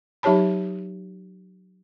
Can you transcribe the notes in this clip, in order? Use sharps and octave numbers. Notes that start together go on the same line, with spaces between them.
F#3 D#4 G4 C#5 A5 B5